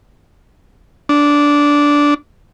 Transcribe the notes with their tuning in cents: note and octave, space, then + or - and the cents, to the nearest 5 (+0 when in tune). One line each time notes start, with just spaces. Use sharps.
D4 -10